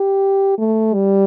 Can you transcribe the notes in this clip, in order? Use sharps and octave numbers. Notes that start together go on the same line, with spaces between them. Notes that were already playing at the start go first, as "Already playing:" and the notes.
Already playing: G4
A3
G3